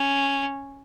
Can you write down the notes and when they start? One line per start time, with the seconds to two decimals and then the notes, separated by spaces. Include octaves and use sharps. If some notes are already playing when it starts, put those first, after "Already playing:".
Already playing: C#4